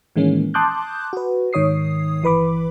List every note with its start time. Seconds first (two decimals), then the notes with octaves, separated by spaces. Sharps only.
0.16 A2 D#3 E3 G#3 A#3 C#4
0.54 A5 C6 D6 D#6 F#6 G6
1.13 F#4 B4
1.53 G#2 D#3 C#5 D#6 C7
2.23 G1 E3 B4 B5 D6